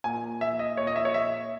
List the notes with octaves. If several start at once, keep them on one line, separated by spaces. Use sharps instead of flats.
A#2 G#5
E5
D#5
A#2 C#5
D#5
E5
C#5
E5